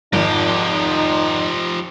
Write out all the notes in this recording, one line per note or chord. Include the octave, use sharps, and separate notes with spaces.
G#1 F2 F3 D#4 G4